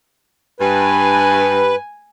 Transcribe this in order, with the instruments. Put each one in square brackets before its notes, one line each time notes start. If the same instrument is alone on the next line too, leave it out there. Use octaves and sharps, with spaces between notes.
[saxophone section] G2 [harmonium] B4 [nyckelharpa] G#5